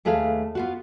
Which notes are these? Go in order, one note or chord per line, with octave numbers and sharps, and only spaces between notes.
D#2 A3 G#4 B4 F5
B3 F4 F#4